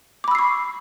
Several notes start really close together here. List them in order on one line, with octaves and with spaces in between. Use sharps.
D6 B5 E6 C7 C#6